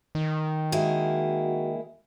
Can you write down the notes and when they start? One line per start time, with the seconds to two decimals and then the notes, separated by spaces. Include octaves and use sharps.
0.15 D#3
0.72 G#3 A#3 E4 F#4